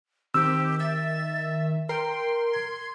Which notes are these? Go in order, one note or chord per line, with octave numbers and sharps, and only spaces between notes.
D#3 C4 G4 E6
E5 A6
A#4 G5 C6
C6 G#6